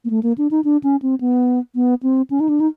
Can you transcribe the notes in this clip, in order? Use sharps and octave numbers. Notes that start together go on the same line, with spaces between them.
A#3
A3
A#3
D4
D#4
D4
C#4
C4
B3
B3
C4
C#4
D#4
D4
D#4